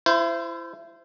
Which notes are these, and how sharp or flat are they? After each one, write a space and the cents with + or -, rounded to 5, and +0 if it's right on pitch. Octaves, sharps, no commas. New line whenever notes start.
E4 +30 C5 -15